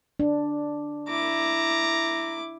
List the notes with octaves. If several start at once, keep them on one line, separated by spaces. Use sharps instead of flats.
D4
E4 A#5 D6